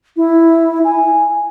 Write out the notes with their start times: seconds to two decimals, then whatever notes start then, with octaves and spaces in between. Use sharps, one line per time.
0.17 E4
0.85 G#5